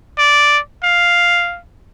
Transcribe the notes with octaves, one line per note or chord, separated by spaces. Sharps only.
D5
F5